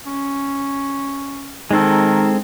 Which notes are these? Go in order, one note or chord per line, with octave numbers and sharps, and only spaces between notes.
C#4
D#3 G#3 C4 D#4 A4